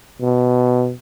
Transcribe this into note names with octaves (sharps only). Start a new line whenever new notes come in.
B2